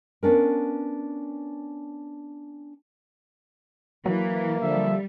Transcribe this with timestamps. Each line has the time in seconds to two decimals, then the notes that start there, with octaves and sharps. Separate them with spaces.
0.23 B3 C#4 D4 A#4
4.06 E3 F#3 A#3
4.62 D3 F3 G3 E5